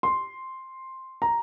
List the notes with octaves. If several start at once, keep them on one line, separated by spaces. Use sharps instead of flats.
C6
A#5